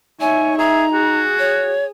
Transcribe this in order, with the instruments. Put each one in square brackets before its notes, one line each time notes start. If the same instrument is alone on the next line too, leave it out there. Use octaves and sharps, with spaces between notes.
[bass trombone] D#4 [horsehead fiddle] C#5 E5 [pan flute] G#5
[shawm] G#4 [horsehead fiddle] E5 [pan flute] A#5
[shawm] F#4 [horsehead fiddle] G#4
[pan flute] C#5